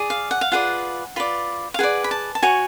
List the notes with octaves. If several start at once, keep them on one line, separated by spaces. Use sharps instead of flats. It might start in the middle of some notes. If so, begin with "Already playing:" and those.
Already playing: G#4 D5
F5
F#5
F5
F4 G#4 B4 D5 F#5
F4 B4 D5
F5
G#4 B4 D5 F#5
B5
A5
A5
F#4 C#5 G#5